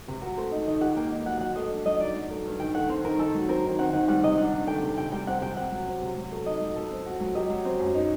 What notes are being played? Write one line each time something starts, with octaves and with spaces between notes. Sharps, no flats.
C3
F#4 A#4
A3 C5
D#4
D#3 D#5
G4 F#5
A#3 G5
D#4
F#3 F#5
F#4 F#5
A3 D#5
D4
F#3 D#5
D#4 D5
F#3
A3
G2
D#3 G5
A3 F#5
C4 C5
D#3 A#4
D#4 A4
F#3
C4 A#4
D#3
C4 F#5
D#3 F#5
G3 F#5
C3 D#5
D4 F#5
D#3
A3 G5
C3
C3 G5
G3 G5
C4 F#5
C3 G5
C3 F#5
F#3
C4
C3
F#3
A3
D#4 D#5
F#3
A4
C4
F#4
F#3
G4 D#5
F#3
C4
F#2
D#4